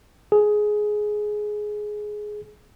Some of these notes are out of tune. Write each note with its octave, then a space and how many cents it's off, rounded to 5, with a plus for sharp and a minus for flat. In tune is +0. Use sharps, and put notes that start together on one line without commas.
G#4 +10